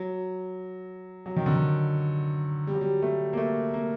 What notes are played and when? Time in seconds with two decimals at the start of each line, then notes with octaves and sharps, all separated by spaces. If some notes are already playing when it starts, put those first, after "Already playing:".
Already playing: F#3
1.26 F#3
1.36 D#3
1.46 D3
1.56 D#3
2.67 G3
2.74 F#3
2.81 G3
3.02 A3
3.33 A#3
3.37 A3
3.74 A#3